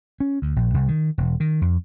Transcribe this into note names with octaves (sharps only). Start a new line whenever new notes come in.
C#4
D2
A#1
C2
D#3
E1
D#3
F2